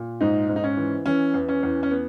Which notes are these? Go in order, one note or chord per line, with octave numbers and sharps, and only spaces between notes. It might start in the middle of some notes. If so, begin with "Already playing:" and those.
Already playing: A#2
G#2 D#4
G#2
D#4
C#4
E3
E3 C#4
E2
C#4
E2
C#4
B3